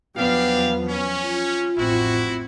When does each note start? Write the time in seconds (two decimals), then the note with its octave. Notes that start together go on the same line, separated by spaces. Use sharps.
0.17 E2 F3 F#3 B3 D4 G4 F5
0.89 C#4
1.25 F4
1.78 A1 F2 C4 E4 F#4